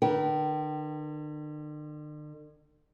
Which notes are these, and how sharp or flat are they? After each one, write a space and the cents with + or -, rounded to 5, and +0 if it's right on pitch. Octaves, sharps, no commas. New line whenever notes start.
D3 +45 B4 -40 G5 -30